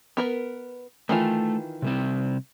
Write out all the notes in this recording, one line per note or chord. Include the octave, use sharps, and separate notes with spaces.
B3 A#4 B4
D#3 E3 A3 F4
C3 G3 C4